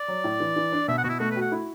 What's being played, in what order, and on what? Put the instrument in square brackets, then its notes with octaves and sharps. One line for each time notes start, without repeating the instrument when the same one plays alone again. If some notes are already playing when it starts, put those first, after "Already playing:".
Already playing: [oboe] D5
[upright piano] F#3
A2
E3
E3
D4
[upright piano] B2 [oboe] E5
[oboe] F#5
[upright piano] B2 [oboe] F#4
[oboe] E4
[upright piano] A3 [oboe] F#4
[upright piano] F#4 [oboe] B4
[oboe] F#5
[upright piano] E4